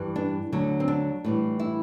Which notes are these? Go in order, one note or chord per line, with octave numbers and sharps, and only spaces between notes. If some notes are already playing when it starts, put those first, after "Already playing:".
Already playing: G2 E3 G3
D4
D2 D3 F#3
C4
D4
A2 E3 G3
E4